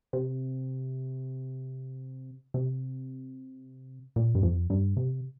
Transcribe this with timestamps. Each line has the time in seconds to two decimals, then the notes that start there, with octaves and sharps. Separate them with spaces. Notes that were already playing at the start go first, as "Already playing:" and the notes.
0.13 C3
2.54 C3
4.16 A#2
4.35 G2
4.43 F2
4.70 G2
4.97 C3